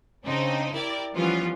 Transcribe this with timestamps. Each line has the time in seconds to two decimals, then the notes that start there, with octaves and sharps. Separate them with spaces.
0.24 C#3 C4 D4 D#4
0.73 E4 G4 A#4 D5
1.15 E3 F3 G3 B3 C#4 F4